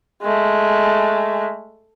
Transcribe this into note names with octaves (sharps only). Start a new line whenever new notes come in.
G#3 A3